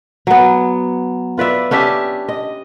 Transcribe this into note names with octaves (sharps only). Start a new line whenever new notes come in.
F#3 B3
F4 B4 D5 E5
C#4 D4 G4 E5
D#5